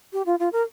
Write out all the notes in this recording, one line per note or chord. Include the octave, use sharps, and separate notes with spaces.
G4
F4
F4
A#4